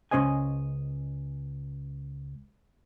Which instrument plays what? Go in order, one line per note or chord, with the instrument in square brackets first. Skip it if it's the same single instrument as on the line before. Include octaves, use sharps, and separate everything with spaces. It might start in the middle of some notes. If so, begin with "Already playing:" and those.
[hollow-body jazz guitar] C#2 F3 C#4 C5 D#5 G#5